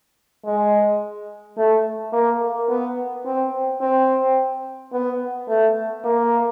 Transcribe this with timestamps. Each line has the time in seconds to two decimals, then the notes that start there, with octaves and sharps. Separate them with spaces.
0.45 G#3
1.57 A3
2.13 A#3
2.69 B3
3.25 C4
3.81 C4
4.93 B3
5.48 A3
6.04 A#3